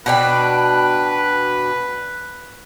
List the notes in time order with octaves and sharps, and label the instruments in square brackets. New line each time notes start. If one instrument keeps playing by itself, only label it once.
[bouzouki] B2 D4 G5 [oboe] B4